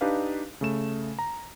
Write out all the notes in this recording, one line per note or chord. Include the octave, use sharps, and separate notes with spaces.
D4 D#4 G4 B4 F5
C#3 A3 E7
A#5